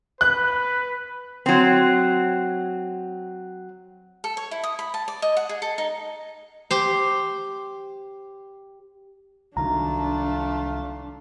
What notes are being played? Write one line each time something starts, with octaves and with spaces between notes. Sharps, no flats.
B4 F#6
F#3 C4
A4
C#5
E4
D#6
B5
A5
D5
D#5
F#5
G#4
A4
D#4
G4 C5
C2 D#3 F#3 A3 D4 F4 A#5